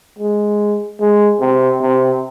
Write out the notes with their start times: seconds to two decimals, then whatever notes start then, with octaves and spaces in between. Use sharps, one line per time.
0.19 G#3
1.00 G#3
1.40 C3
1.82 C3